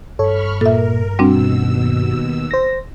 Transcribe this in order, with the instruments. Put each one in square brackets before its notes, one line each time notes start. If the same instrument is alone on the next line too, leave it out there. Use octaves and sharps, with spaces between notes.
[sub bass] G2 [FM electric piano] A4 C#5 [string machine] B5 C#6 F6
[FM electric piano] A#2 [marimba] A4 E5 [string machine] A#4
[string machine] D#2 B2 E6 [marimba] G3 C4 D4 [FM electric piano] F#4
[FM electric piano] C5 A#6